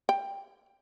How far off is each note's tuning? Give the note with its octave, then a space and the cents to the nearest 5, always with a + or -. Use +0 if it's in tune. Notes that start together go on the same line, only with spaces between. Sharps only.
G5 +15